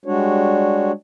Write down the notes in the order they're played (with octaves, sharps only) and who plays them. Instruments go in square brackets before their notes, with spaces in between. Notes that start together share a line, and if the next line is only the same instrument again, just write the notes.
[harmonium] G3 G#3 D4 F#4 C#5